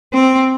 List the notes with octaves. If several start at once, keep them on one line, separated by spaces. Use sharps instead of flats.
C4